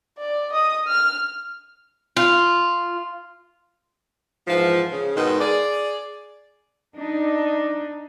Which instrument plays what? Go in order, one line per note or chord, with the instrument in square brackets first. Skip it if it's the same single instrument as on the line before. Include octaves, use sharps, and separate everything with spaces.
[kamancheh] D5
D#5 D#6
F6
[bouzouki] F4
[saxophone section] G#2 E3 F3
C#3
G#2 B2 D#3
G#4 D5
[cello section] D4 D#4